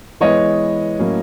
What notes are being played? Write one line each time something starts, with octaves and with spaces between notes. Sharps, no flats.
E3 G#3 B3 C#5 D#5
A2 F#3 A#3 C#4